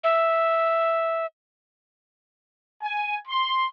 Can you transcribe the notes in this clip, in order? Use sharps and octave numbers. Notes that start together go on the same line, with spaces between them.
E5
G#5
C6